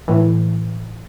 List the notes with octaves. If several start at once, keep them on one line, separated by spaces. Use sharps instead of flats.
A2 E3